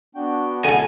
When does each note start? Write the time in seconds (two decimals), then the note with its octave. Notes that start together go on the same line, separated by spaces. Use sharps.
0.15 B3 D4 F#4 G5
0.64 D2 D3 E4 A4 G#5 A5